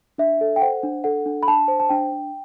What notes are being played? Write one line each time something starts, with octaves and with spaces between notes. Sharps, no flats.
D4 E5
A4
G5
C5 F#5
D4
A4 F#5
D4
B5
D4 A5
C5
A5
D4 G5
D4